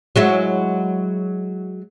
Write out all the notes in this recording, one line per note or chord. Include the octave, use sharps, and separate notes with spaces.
F#3 G#3 E4